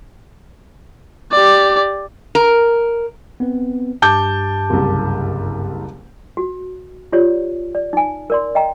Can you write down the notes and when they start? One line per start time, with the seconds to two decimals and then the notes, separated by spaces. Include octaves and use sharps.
1.32 G4 D5
2.35 A#4
3.40 B3 C4 B4
4.02 G2 G4 A5 D6 G6
4.70 F#1 C2
6.37 F#4
7.12 F4 G4 C#5 D5
7.75 D5
7.93 D#4 G#5
8.30 A#4 D5 C6
8.55 D#5 G5 A#5